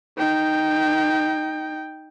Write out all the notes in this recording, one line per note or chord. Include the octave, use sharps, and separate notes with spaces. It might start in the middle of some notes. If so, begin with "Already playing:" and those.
D#4 G5